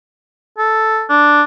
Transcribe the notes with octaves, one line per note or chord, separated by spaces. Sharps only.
A4
D4